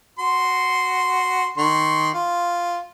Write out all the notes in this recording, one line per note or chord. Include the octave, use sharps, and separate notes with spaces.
F#4 C6
D#3 C6 C#6
F4